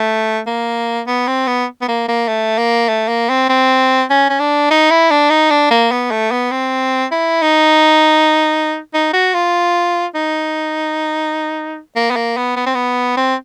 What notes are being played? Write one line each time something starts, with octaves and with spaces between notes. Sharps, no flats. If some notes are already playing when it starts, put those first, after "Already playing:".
Already playing: A3
A#3
B3
C4
B3
B3
A#3
A#3
A3
A#3
A3
A#3
C4
C4
C#4
C#4
D4
D#4
E4
D4
D#4
D4
A#3
B3
A3
B3
C4
E4
D#4
D#4
F#4
F4
D#4
A#3
B3
A#3
B3
B3
C4
B3
C4